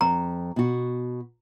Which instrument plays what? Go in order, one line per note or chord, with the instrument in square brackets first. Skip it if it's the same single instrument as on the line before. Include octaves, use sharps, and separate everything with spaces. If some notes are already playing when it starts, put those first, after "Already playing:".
[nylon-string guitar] F2 [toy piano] A#5
[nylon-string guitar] B2 F#4